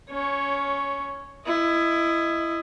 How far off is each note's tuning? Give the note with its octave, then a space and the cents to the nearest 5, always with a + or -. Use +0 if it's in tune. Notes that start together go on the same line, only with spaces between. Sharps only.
C#4 +15 C#5 +0
E4 +20 D#5 +0